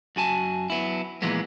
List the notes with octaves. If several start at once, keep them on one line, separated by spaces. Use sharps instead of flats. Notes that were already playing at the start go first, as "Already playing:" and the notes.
F#2 F#4 G#5 A5
F#3 B3 E4
A#2 E3 F3 G#3 B3